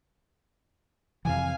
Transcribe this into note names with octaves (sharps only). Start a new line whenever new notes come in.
F2 C3 E3 F5 G#5